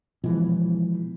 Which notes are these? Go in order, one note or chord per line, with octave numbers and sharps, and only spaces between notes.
B2 E3 F3 G#3